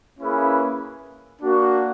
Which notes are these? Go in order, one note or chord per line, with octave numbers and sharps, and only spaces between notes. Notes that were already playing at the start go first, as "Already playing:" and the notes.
A#3 C#4 E4 G#4 B4
A#3 D4 F#4